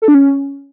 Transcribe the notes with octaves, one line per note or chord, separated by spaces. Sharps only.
A4
D4
C#4